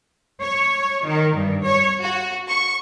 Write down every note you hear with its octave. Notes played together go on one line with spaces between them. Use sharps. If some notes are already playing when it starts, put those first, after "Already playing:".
C#5
D#3
G2
C#5
F#4
C#6